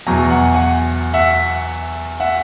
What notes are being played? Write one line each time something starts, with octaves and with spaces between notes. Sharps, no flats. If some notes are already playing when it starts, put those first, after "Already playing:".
E2 B2 F#3 G#5 A#5
F#5 G#5
F#5 G#5
E5 F#5
E5 F#5